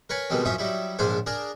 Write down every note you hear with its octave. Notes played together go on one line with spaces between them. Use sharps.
A#4 B4 C#5 G#5
B2 D#3 G3 G#3 C4
F#2 F3 C#4 D#4 E5 D#6
F#3 G3 D#4 E4
A#1 G#2 C#3 D4 C5 G#5
D4 G#4 A#4